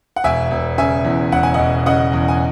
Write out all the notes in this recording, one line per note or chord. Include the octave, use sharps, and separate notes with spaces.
F#5
E1 E5 G#5
E1
C#3 E5 G#5
E2
E1 F#5
G#5
D#5 F#5
E1
C#3 D#5 F#5
E2
G#5